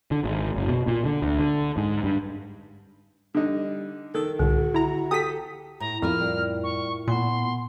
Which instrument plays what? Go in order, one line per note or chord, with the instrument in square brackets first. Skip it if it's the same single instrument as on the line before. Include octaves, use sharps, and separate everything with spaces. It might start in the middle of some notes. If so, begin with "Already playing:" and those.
[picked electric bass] D3
G#1
F#1
B2
A#2
D3
D2
D3
G#2
G2
[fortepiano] D3 D#4 [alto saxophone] G3
[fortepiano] D#3 [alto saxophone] A4
[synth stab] C2 A2 [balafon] D3 [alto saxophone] F#4
[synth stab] E4 A#5
[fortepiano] G4 A4 [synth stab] D#6 B6
[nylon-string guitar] A2 [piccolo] A#5
[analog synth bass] F2 [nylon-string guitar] A2 A#3 F4 [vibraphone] B5 [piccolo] F6
[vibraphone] G3 D5
[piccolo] C#6
[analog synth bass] A#2 [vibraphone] B3 F#5 G#5 [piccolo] C6